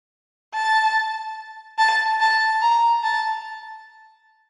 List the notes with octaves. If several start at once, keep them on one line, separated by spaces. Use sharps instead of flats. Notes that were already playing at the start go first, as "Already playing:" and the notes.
A5
A5
A5
A#5
A5